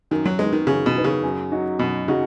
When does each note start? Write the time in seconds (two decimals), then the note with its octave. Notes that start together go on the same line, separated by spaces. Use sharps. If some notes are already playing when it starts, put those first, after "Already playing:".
0.11 F#2 D#3
0.26 F#3
0.39 D#3 G#3 B3
0.53 D#3
0.67 F#2 C#3
0.86 B2
0.96 D#3 B3
1.04 C#3
1.23 F#2
1.52 F#3 D#4 F#4
1.79 F#2 B2
2.08 C#3 F#3 D#4 F#4